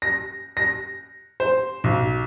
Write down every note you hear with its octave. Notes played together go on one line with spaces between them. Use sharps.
A#6
A#6
C5
B1